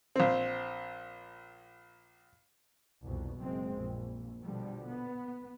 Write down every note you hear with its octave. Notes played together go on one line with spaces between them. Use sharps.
A#1 C4
C2 F2 B2
F#1 F#2 G#3 C4
A#1
B2 D3 F3 G3
B3